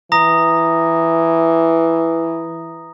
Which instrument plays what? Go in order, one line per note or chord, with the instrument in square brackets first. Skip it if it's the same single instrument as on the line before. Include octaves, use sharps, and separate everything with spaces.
[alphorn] E3 [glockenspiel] A#5 D#6 A#6